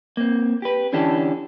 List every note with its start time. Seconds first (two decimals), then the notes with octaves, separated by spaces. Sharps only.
0.17 A#3 C4
0.62 G4 B4
0.93 D3 E3 C#4 D4 G4 A4